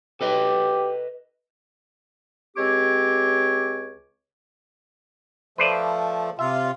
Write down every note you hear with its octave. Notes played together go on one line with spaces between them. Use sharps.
G4 A4 B4 D#5
C#2 G#3 C4 G4 C#5 D6
F3 A3 B4 C5 D5
C3 F4 E5